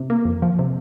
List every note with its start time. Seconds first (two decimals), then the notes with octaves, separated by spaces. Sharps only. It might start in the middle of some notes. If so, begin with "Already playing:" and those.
Already playing: C3
0.10 A#3
0.25 F2
0.42 F3
0.59 C3